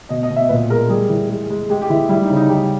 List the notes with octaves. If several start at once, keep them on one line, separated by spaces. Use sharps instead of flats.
B2 D#5
D#5
B2
E5
A#2 B4
G#3 A#4
G3 G#4
E3
G#3
G#3
G#3 G4
G4
E3 E4
G3 E4
D#4
C#3
D#4
G3 G4